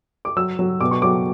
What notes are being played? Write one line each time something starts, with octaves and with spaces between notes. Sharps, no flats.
D6
F#3 E6
F#3
B2 D6
C#6
F#3 D6